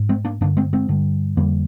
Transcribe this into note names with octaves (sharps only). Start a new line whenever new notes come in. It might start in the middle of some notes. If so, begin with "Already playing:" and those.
Already playing: G#2
G#3 C4
A#3 D4
G2 D3 A#3 D4
G#3 C4
G#3 C4
G2 D3
F2 D3 G3 A#3